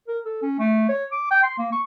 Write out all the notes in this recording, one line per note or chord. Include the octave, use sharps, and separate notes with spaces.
A#4
A4
C#4
A3
C#5
D6
G5
C6
A#3
C#6